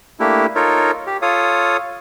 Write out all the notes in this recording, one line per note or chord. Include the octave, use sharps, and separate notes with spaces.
A3 A#3 D4 E4 G4
D#4 F4 A4 A#4 C#5
G4
F4 A4 C#5 F5 D#6